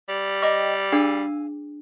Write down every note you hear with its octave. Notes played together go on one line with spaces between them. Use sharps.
G3
D#5 G5 A#5 D6
D4 G#4 F5 G#5 E6